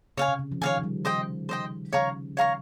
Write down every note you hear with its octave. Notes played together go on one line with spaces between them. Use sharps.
C#3 C#5 F5 G#5
C3
C#3
F3
D#3 C#5 F5 G#5
F3
G3
C5 D#5 G5
C5 D#5 G5
C#3 C#5 F5 A#5 C#6
C#5 F5 A#5 C#6